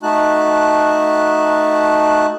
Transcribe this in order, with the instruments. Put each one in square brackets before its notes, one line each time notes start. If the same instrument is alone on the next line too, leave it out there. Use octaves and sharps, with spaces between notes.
[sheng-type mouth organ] A3 D#4 F#4 A5 F#6